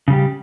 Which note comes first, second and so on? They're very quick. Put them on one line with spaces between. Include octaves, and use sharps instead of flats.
C#3 G3 G4